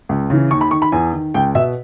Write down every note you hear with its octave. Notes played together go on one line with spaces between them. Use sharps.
C#2
C#3 E3
D#2 C#6
B5
D#3 C#6
B5
E2 G#5
D#3
C#2 G5
B2 E5